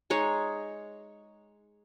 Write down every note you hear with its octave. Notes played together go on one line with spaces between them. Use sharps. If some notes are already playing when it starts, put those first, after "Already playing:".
G#3 D#4 C#5